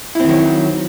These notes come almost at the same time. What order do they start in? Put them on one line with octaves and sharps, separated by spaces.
E4 C4 D#3 F#3